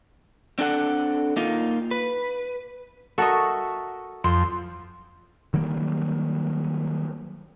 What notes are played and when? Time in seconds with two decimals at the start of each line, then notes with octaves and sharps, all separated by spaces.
0.59 C4 D4 A4 F#5
1.37 A#3 D#4 F4
1.91 B4
3.18 F#4 A4 A#4 D#5 E5 C#6
4.24 F2 C6
5.54 D#3 F#3 G3 A#3